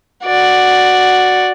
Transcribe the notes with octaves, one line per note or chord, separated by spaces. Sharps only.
F#4 D5